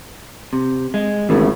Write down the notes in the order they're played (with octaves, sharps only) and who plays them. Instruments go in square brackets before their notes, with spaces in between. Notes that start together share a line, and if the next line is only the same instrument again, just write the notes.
[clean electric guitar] C3
G#3
[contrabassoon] G#1 [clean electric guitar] E2 A2 C#3